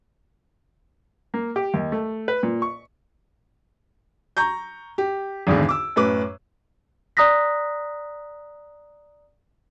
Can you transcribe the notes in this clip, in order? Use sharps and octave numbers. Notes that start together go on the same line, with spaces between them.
A#3
G4
D#2
A3
B4
A#2
C#6
A#5 C#6 G6
G4
G#1 E2 G#2 D3
D6 E6
F#2 A2 B4 D6
D5 A#5 D#6 F#6 A#6 B6